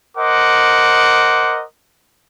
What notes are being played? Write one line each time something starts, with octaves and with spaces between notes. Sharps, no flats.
A#4 C5 D#5 F#5 D6